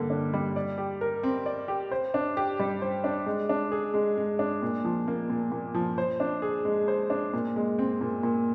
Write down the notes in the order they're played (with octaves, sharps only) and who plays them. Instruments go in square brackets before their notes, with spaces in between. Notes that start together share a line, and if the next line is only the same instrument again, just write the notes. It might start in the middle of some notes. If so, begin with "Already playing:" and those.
Already playing: [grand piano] D3 G3 A#3
D4
G3
D5
G4
A#4
C4
D5
G4
C5
D4
G4
G3
C5
D4
G#3
D4
G#4
G#3
G#3
D4
A#2
F3
A#3
A#2
A#2
F3
C5
D4
G#4
G#3
C5
D4
A#2
G#3
C4
A#2
A#2